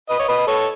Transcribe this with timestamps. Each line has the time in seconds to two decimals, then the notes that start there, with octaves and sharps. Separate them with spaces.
0.09 B4 D#5
0.19 C#5
0.28 B4 D#5
0.47 A4 C#5